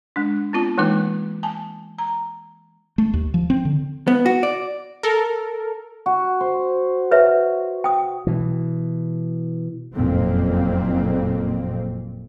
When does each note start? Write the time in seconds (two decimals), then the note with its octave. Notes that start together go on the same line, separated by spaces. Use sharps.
0.16 G#3 D4
0.53 B3 C4 F4 A5
0.78 E3 G#3 A#3 D#4 B4 D6
1.43 G#5 A5
1.98 A#5
2.98 A3
3.14 D#2
3.34 F3
3.50 C4
3.65 D3
4.08 B3
4.26 F#4
4.43 D5
5.03 A4 A#4
6.06 F#4
6.41 C5
7.11 B4 C#5 E5
7.84 G5 D#6
8.27 B2 E3
9.94 F#1 F2 A#2 A#3 C4